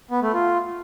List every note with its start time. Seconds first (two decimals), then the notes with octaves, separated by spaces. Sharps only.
0.11 B3
0.22 A3
0.33 F4